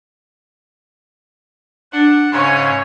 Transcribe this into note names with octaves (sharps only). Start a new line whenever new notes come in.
D4 F#5
G#2 C#3 C#5 G#5